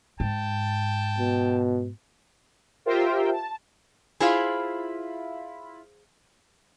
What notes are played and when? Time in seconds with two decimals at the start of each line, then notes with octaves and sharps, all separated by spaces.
0.20 G#2 G5 A5
1.18 B2
2.85 F4 G4 A#4 C5 E5 G5
3.32 A5
4.20 E4 F4 G#4 C5 F5 B5